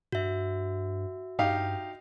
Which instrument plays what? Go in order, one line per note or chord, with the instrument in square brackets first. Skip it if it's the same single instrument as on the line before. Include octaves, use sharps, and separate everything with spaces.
[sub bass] G2 [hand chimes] F#4 E5
[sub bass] G2 [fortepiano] D#4 G4 F5